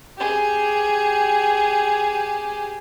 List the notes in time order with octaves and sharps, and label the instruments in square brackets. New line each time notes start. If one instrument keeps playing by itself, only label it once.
[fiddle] G4 G#4